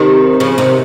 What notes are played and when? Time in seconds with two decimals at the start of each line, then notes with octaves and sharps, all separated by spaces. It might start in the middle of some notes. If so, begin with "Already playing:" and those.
Already playing: C3 D#3
0.40 C#3 F3
0.58 C3 D#3